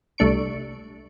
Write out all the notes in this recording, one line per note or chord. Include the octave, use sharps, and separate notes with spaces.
C2 A3 D4 C#6 D7